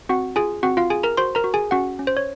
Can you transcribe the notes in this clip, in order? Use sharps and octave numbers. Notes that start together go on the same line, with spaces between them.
C4 F#4 F#5
F4 G#4 G#5
C4 F#4 F#5
F4 F5
G#4 G#5
A#4 A#5
F#4 C5 C6
A#4 A#5
F#4
G#4 G#5
C#4 F#4 F#5
C#4
C5
C#5